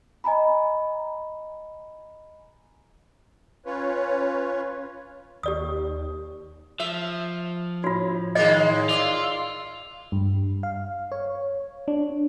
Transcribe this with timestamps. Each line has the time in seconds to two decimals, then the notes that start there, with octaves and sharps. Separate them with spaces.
0.24 D#5 G#5 A#5 B5
3.66 C#4 F4 B4 C#5
5.43 D#2 G4 D5 D#6
6.80 F3 E5
7.84 A2 F4 F#4 C#5
8.35 D#3 G#3 A#3 D#5
8.89 F4 D5 F5 C6 E6
10.12 G2
10.63 F5
11.12 C#5
11.88 D4